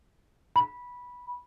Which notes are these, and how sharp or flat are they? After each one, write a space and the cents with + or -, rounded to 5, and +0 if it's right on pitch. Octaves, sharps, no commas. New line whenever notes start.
B5 -10